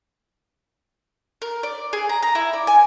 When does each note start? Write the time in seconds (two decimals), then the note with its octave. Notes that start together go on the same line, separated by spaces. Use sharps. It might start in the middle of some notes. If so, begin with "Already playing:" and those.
1.42 A#4
1.63 D5
1.93 G#4
2.09 A#5
2.23 A#5
2.35 E4
2.53 D5
2.67 G#5